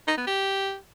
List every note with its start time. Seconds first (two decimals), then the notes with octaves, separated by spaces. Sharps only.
0.08 D#4
0.17 B3
0.27 G4